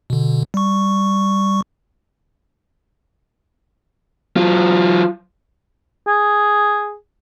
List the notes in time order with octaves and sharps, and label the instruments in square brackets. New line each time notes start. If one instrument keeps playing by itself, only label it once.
[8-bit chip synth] B2 D3
G3 C#6
[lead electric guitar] F#3 F4
[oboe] G#4